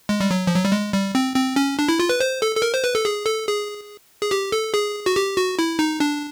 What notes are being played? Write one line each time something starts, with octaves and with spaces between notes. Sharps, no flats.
G#3
G3
F#3
F3
F#3
G3
G#3
G3
C4
C4
C#4
D4
E4
F4
B4
C5
A4
A4
A#4
C5
B4
A4
G#4
A4
G#4
G#4
G4
A4
G#4
F#4
G4
F#4
E4
D#4
D4